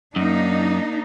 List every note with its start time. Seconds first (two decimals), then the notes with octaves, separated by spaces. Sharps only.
0.16 F#2 A#3 D4 D#4